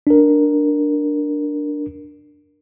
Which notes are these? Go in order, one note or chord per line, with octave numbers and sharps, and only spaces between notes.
D4 A#4